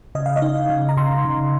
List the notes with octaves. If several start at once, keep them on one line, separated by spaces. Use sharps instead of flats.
C#3 D#5
F5
D#5
D#4
C#3
A#5
C#3 C6
C#3